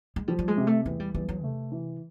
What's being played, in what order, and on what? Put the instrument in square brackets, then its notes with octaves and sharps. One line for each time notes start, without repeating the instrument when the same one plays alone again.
[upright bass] G#3
[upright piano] F3 [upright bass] G3
[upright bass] G3
G#3
[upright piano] C3
[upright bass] A3
[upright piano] E2 [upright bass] A3
[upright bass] G3
[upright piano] E2 [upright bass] G3
[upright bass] F#3
[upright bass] C3 [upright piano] A3
[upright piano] E3